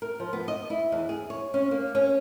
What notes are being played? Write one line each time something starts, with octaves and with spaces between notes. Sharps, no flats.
A#4
F3
B3
D#5
E4
E2
G#4
C#5
C#4
A#3
C#4